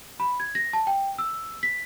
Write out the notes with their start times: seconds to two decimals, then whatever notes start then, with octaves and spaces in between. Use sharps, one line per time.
0.20 B5
0.40 G#6
0.55 A#6
0.73 A5
0.87 G5
1.18 E6
1.63 B6